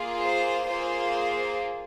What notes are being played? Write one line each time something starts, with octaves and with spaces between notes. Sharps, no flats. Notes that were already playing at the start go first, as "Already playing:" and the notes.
Already playing: A#3 F4 G#4
C5
A#3 F4 G#4 C5